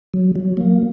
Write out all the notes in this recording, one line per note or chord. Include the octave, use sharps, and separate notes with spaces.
F#3
F#3
A#3